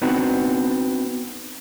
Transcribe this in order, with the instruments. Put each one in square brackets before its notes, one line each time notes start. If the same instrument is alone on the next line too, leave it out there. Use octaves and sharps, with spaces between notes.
[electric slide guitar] B3 C4 D4 D#4 F#4 B4